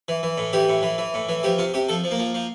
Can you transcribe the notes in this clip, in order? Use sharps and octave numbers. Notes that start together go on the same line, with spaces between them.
E3
E3
A2
E3 G4
A2
E3
E3
A2
E3
F3 G4
C3 F4
C3 G4
F3 A4
F3
A#3
F3
F3